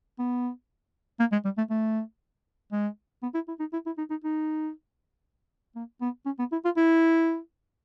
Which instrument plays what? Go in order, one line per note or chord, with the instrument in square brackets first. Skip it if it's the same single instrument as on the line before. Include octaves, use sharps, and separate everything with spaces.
[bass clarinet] B3
A#3
G#3
G3
A3
A3
G#3
B3
E4
E4
D#4
E4
E4
D#4
D#4
D#4
A#3
B3
C#4
B3
E4
F4
E4